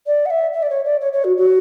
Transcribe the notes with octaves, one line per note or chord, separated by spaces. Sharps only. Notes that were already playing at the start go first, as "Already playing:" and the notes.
D5
F#5
E5
E5
D5
C#5
D5
C#5
C#5
F#4
F#4